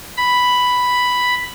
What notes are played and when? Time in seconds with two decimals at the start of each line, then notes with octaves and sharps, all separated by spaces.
0.17 B5